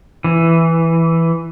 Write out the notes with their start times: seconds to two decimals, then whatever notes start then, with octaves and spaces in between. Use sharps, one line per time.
0.24 E3